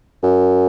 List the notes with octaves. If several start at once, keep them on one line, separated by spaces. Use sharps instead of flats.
F#2